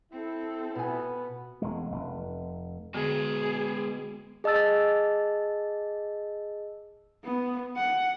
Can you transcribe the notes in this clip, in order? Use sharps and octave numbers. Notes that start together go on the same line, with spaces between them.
C4 E4 A4
B2 B3 G#5
E1 G#3
F1
D3 G#3 B3 F#4 G#4
G#4 D#5 A5 E6 A6
B3
F#5